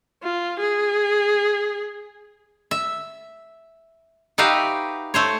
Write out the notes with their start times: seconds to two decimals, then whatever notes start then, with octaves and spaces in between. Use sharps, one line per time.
0.23 F4
0.60 G#4
2.71 E5
4.38 D#4 F#4 G4 B4 E5 F5
5.14 A3 C5 C#5